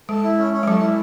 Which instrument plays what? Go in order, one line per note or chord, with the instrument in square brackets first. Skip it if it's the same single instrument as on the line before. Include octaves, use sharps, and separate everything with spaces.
[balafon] G#3 [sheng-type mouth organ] A4
[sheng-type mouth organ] E4
C#4
C#4
[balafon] G#3
[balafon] F#3 [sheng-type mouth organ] A4
[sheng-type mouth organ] E4